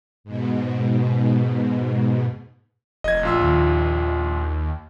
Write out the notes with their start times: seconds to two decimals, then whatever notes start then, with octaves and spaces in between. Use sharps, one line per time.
0.24 G#2 B2
3.04 F1 D#5 G#6
3.23 A#1 F4 E6
3.40 D#2